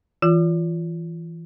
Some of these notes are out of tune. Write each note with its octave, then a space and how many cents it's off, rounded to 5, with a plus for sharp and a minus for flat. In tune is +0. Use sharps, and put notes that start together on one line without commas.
E3 +0 F4 +0